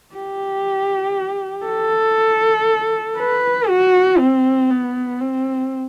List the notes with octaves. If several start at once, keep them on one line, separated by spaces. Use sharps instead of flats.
G4
A4
B4
F#4
C4
B3
C4